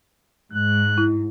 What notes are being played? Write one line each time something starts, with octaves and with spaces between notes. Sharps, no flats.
G#2 F#6
E4